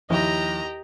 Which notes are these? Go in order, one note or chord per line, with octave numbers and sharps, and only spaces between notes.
D#2 F3 E4 G4 D#5 A#5